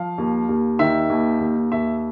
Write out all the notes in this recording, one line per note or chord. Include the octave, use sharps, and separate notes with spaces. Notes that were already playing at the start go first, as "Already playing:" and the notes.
Already playing: F3 F5
D#2
D#2
D#3 E5
D#2
D#2
D#2 E5